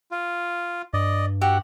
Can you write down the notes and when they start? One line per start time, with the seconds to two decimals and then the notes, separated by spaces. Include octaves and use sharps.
0.11 F4
0.94 G2 D5 D#5
1.41 F#4 G4 E5 F#5